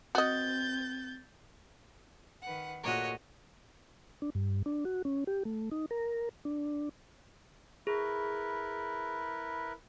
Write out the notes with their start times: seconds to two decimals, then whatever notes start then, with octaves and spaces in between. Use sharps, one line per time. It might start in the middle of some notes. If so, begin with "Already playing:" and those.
0.15 C4 F#4 D#5 G6 A6
2.42 D#3 B4 F#5
2.84 A#2 A3 F#4 G#4 A#4 C#5 D#5
4.22 D4
4.35 G2
4.66 D4
4.85 F#4
5.05 C#4
5.27 G4
5.45 A3
5.71 D#4
5.91 A#4
6.45 D4
7.87 E4 G#4 A#4 B4